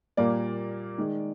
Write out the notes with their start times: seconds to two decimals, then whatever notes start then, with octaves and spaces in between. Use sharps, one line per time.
0.17 A#2 G3 A#3 D5
0.98 D#3 G#3